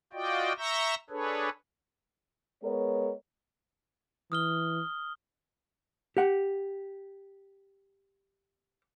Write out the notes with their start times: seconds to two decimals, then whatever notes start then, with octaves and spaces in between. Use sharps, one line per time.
0.13 F4 F#4 D5 D#5 G5
0.58 E5 A#5 C#6 E6 G6 A#6
1.10 D4 G#4 A4 B4 C#5
2.63 G#3 B3 A#4 C#5
4.32 E3 D#6 F6 G7
6.17 G4 F#5